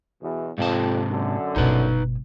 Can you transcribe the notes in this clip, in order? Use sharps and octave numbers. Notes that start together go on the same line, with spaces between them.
E2 B2
F2 G#2 C3 A5
F#2 D3
G1 B2 D#4 B4